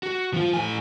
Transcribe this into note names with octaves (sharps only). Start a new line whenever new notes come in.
F#4
F3 F4
A2 G#5